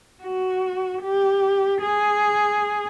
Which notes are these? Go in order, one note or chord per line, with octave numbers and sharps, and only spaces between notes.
F#4
G4
G#4